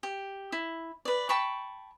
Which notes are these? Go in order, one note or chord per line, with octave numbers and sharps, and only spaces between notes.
G4
E4
B4 D5
G5 A5 B5 C#6